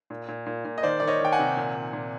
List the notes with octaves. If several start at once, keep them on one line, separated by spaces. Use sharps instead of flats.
A#2
A#2
A#2
A#2
D#5
D#3 C5 D5
D#3 D5
C#5 D#5
D#3 G5
F#5 G#5
C3
A#2
A#2
A#2